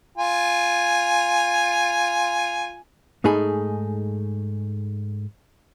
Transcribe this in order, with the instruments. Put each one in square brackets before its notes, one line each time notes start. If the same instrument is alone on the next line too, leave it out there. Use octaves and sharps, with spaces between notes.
[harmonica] F4 G#5
[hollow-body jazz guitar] G#2 A3 D#4 G#4 B5